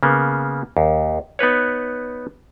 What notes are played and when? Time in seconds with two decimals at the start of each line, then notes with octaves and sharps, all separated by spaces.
0.03 C#3 A#3 B3
0.77 D#2
1.39 B3 D#4 B4 C#5